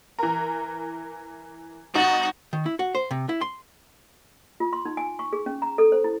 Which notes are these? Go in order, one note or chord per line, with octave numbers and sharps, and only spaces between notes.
E3 A#4
G#1 D#4 F#4 A6
D#3
E4
F#4
C5
C3
E4
C6
F4
C6
D#4
G#5
C#6
G#4
C#4
A#5
A4
C5
E4